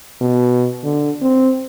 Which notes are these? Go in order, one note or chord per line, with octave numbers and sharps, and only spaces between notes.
B2
D3
C4